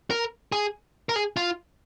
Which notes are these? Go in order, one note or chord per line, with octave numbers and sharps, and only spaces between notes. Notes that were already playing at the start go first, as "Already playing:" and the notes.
A#4
G#4
A#4
G#4
F4